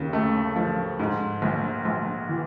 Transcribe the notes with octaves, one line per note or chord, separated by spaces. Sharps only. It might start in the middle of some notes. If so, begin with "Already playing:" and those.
Already playing: D#2 C#3
A3
F3
G#2
A#1
A#1
E3